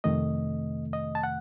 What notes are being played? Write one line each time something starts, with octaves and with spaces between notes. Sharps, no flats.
F2 C3 D#3 A3 D#5
D#5
A5
F#5